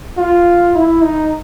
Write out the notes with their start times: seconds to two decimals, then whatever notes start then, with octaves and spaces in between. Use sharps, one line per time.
0.17 F4
0.74 E4
1.02 D#4